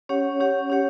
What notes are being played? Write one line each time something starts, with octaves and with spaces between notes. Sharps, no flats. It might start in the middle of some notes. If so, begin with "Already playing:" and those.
C#4 G4 C#5 F#5
C#4 G4 C#5 F#5
C#4 G4 C#5 F#5